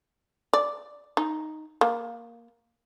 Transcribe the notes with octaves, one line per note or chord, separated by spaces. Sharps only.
D5
D#4
A#3